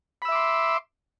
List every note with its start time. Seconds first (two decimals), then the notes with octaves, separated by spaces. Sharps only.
0.22 B5
0.25 E6
0.29 E5
0.32 D6
0.35 C6